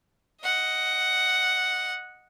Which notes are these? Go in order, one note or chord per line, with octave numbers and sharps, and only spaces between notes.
D#5 F#5